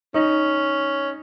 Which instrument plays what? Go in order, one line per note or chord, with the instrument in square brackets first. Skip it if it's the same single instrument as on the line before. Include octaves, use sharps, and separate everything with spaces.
[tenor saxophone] C#4 [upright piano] D#4